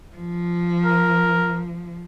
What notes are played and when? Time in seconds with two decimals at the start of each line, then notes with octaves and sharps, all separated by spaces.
0.16 F3
0.85 A#4